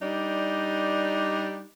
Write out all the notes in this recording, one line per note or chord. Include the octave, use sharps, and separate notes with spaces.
G3 D4 D#4